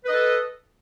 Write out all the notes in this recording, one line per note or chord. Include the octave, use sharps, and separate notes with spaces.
A4 B4 D#5